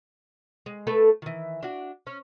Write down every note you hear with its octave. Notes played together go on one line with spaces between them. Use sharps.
G#3
A3 A4 B4
D#3 E3
D4 F#4
C#4